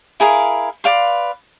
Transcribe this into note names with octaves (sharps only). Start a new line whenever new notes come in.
E4 G#4 A#4 F5
B4 D5 F5 C6